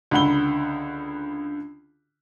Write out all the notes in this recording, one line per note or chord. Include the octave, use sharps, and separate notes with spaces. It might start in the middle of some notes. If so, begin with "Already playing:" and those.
C#2 D3 F#5 B5 G7